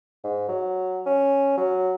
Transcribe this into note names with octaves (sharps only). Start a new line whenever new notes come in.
G#2
F#3
C#4
F#3